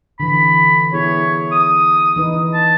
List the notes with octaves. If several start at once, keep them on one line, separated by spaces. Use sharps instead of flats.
D3 E3 B5
B3 E4 G#4 C#5
D#6
E3 D#4 B4
A5